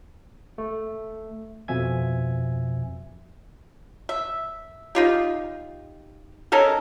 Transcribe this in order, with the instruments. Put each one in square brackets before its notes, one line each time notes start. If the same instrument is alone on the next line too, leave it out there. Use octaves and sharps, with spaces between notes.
[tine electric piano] A3
F2 B2 F3 E5 G#5 G#6
[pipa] E5
D#4 F4 G4
C#4 D#4 A4 A#4